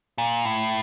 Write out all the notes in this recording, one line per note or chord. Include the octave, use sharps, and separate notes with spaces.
A#2
A2